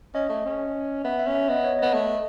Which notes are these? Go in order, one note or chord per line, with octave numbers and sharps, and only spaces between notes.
C#4 D#5
A3
C#4
B3 E5
E5
C#4
E5
B3 D#5
C#5
B3 D#5
A3